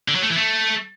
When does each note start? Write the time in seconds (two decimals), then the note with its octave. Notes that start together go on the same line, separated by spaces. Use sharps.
0.08 D3
0.15 F#3
0.23 A3
0.30 E3
0.37 A3